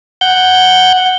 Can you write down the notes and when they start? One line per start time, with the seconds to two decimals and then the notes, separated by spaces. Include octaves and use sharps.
0.21 F#5 G6